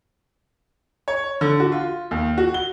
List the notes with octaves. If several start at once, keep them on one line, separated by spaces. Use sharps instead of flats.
C#5
D3
F#4
F4
D#2
F#4
G7